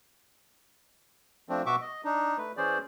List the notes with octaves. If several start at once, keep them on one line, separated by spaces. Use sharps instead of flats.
F3 A3 C4 D4
B2 F#4 E5 C#6 D6
D#5
D4 D#4
A3 B4
E3 C#4 G#4 C5 D5